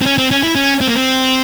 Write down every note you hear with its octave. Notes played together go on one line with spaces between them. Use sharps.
C4
C#4
C4
C#4
E4
C#4
C4
A#3
C4